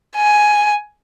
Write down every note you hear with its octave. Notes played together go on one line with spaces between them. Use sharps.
G#5